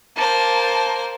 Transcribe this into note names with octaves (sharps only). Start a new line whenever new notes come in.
A#3 C5 A5